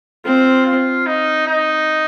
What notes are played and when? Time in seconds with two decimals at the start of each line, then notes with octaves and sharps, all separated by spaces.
0.25 C4 F4
0.66 F4
1.06 D#4
1.47 D#4